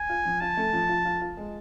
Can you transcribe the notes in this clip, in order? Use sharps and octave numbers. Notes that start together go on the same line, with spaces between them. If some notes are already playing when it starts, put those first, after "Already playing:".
Already playing: G#5
F4
F3
F4 A5
A3
F3
F4
F4
F4
G#3